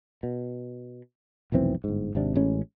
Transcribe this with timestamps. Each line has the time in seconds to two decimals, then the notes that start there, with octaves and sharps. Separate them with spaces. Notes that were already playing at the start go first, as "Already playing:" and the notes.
0.23 B2
1.52 F1 B1 E3 C4
1.84 G1 G#2
2.15 G#1 C3 D4
2.35 A1 G#3 C#4